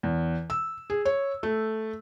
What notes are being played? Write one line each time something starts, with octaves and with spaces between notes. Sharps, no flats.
E2
E6
G#4
C#5
A3